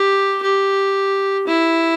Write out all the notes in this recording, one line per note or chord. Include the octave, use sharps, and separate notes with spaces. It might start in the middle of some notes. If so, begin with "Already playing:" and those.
Already playing: G4
G4
E4